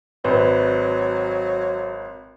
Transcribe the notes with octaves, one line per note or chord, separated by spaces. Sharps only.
G#1 F#3 B4 C5